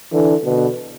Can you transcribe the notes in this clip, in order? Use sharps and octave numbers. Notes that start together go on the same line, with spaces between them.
D3 E3
B2 D3